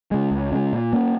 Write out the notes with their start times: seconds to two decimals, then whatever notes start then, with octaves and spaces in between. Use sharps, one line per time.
0.11 C#3 G#3
0.31 C#2
0.52 C#3 G#3
0.73 A#2
0.93 A#3 C#4